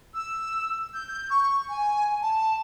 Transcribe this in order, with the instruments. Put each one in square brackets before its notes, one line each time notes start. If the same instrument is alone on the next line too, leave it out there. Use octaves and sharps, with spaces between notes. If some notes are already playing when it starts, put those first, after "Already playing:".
[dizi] E6
G6
G6
C#6
G#5
A5